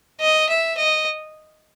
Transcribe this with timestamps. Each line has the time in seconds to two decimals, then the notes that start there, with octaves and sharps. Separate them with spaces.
0.21 D#5
0.49 E5
0.77 D#5